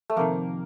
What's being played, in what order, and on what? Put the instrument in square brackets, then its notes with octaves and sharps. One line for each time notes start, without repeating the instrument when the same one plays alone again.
[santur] A3
[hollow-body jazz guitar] F2 C3 D#3 [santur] A#3